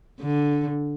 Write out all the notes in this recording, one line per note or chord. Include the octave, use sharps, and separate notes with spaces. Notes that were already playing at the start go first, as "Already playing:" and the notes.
D3